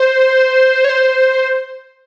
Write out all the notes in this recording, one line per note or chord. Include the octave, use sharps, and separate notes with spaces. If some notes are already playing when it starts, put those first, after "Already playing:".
Already playing: C5
C#5
C5